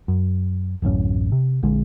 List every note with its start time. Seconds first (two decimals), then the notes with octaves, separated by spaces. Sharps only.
0.08 F#2
0.82 D1 A1 F#2 C#4
1.32 C3
1.63 A#1 D3 G#3